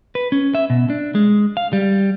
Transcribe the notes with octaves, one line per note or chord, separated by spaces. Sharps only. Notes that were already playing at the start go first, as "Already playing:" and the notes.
B4
C#4
E5
B2
D4
G#3
F5
G3